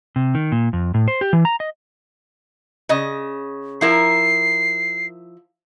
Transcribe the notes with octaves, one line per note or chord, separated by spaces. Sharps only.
C3
D#3
A#2
F2
A2
C5
G4
E3
A#5
D#5
C#3 D#5
F3 E4 A#4 C7